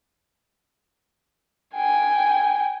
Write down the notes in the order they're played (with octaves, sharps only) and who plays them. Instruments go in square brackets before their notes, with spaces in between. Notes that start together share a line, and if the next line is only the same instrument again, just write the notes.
[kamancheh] G5 G#5